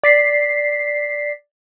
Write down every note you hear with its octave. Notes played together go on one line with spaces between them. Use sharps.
D5 B6 C7